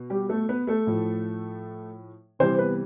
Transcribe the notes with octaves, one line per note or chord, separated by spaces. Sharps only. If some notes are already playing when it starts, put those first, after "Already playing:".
Already playing: B2
G3 G4
A3 A4
B3 B4
A3 A4
A2 F3
C3 E3 G3 C4 C5
B3 B4